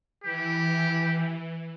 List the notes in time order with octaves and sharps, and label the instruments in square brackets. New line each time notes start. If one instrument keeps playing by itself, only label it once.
[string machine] E3 [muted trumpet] G4